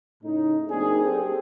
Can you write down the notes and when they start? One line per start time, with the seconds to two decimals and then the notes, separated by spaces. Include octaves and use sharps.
0.23 A2 C#3 D#4
0.69 F#3 A#3 C4 D4 D#4 G#4
1.04 G4 A4 C5 G5